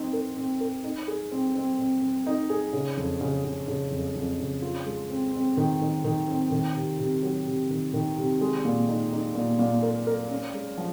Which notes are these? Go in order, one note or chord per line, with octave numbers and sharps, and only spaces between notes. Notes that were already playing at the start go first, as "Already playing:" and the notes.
Already playing: C4 D#4
A#4
C4
A#4
D#4
G#4
C4
C4
C4
C4
D#4
G#4
C#3
F2
C#3
C#3
C#3
F2
F2
C#3
F4
G#3
C4
C4
D#3
D#3
D#3
C4
D#3
C3
C3
F#3
C3
D#3
D#3
C3
G#3
A#2
D#4
D#4
A#2
A#2
A#4
A#4
C#4
G#3
F3